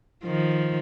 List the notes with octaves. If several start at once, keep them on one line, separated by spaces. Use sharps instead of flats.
D#3 F3